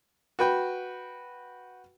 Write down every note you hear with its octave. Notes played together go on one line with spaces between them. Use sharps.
F#4 B4 G5